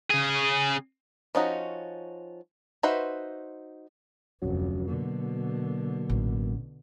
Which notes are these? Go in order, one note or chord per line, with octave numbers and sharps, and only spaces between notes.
C#3 G#4
F3 C#4 D#4 F#4
D#4 F#4 B4 C5 E5
F1 D2 F#3 C#4 F#4
B2 D3 F#3 A#3
A1